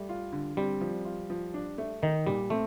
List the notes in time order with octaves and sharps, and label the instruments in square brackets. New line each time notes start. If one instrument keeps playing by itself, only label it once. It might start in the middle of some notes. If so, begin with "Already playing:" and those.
Already playing: [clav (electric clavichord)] G3 [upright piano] A3
[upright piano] F4
D3
[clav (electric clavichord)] G3 [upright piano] C4
[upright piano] F3
F4
F3
D4
A3
[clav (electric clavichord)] D#3 [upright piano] D#4
[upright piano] A#2 [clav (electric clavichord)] G3
[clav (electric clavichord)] A3 [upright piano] C4